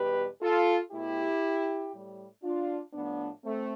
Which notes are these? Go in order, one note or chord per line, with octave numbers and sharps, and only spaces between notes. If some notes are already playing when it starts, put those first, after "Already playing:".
Already playing: E2 B2 G3 G4 B4
F4 A4
B2 A3 E4 G4
A2 G3
D4 F4
A2 F3 A3 B3 D4
A3 C4